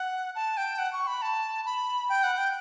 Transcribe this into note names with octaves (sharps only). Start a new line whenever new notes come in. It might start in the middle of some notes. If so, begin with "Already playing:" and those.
Already playing: F#5
A5
G5
F#5
C#6
B5
A5
B5
G5
F#5
G5